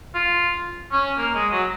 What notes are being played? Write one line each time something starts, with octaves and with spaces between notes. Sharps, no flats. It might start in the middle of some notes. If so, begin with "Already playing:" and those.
F4
C#4
A#3
G#3
F#3